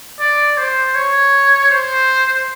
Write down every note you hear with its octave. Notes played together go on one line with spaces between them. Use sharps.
D5
C5
C#5
C5